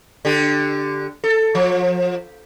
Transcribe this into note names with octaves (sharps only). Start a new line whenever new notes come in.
D3 G4
A4
F3